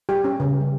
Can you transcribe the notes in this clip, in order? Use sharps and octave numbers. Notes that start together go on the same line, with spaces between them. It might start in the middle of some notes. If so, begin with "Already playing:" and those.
G3 G4
C#4
C#3
G3 C#4